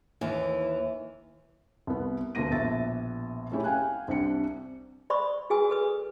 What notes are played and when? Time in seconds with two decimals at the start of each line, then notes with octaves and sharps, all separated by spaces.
0.21 D#2 E3
1.87 C2 B3
2.35 D2 B2 A#3 A#6 D#7
2.51 A#1 B2 E5 A6
3.52 A3 C4 C#4 E4 G4 G#4
3.64 F5 G5 G#5 F#6
4.08 C2 C4 D4 G4 C#7
5.10 C5 D5 B5 C#6 D#6
5.50 F#4 G#4 B4 G#5 D#6
5.70 A4 B4 D#6